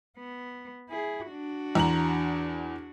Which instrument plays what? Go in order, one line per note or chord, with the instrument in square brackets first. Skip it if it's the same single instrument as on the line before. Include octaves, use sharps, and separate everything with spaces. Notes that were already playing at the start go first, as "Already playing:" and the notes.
[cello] B3
E4 G#4
D4 F#4
[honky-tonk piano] E2 A#5 F#7